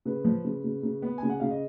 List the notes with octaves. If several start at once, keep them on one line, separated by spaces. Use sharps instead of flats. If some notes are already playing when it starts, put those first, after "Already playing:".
C#3 B4
F3
C#3
C#3
C#3
B3
C#3 G#5
F#5
C#3 F5
D#5